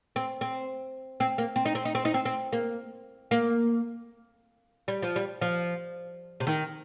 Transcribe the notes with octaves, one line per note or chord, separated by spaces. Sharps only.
C4
C4
C4
A#3
C4
D#4
C4
D#4
C4
D#4
C4
C4
A#3
A#3
G3
F3
G3
F3
C3
D#3